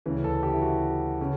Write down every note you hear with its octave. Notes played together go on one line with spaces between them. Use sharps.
D2 C#3 E3
A4
G4
E4
F#4
C#3